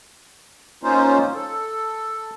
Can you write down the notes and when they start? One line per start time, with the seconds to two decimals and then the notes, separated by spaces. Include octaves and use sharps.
0.83 A#3 C#4 D#4 F4 C5
1.35 A4